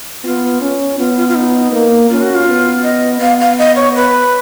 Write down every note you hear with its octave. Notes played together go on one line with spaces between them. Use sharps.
B3 F4
C#4
B3 F4
F4
F4
D#4
A#3
C#4 F4
F#4
F4
B3
D#5
B3 F5
F5
D#5
C#5
B4